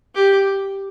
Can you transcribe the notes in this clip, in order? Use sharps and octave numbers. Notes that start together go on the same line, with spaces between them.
G4